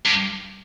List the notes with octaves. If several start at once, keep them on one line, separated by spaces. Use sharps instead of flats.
G2